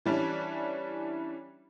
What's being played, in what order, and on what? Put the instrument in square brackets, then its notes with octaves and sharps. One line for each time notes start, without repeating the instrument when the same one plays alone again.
[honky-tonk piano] E3 G3 C#4 D4